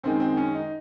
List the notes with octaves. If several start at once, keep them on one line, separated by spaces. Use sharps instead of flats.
F#2 D#3 G#3 C4
C4
C#4
D#4